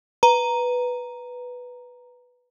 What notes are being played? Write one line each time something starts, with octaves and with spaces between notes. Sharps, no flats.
B4 A#5